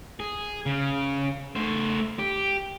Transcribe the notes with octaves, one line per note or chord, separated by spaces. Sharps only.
G#4
C#3
A3 C5
G4